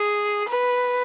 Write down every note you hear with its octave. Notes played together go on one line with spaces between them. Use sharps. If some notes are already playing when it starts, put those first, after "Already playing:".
Already playing: G#4
B4